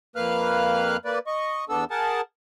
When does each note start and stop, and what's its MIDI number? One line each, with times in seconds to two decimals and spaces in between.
0.16 0.97 41
0.16 0.97 58
0.16 0.97 71
0.16 0.97 77
0.16 0.97 89
0.16 0.97 90
1.05 1.19 58
1.05 1.19 71
1.05 1.19 74
1.27 1.65 75
1.27 1.65 85
1.69 1.84 40
1.69 1.84 59
1.69 1.84 62
1.69 1.84 69
1.69 1.84 88
1.91 2.21 68
1.91 2.21 70
1.91 2.21 78
1.91 2.21 81